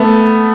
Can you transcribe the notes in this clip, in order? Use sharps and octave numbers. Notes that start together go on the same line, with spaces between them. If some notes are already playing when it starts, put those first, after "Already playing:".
Already playing: A3 B3